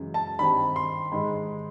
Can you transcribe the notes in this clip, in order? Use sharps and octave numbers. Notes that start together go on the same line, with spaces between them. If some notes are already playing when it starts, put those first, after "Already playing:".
Already playing: F#2 C#3 E3 G#3
A5
G2 D#3 G3 C4 B5
C6
G#2 D#3 G#3 B5
C6